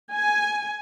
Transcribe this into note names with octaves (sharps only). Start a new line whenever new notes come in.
G#5